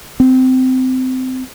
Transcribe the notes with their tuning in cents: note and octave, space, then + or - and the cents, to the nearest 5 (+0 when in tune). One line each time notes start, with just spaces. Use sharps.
C4 -20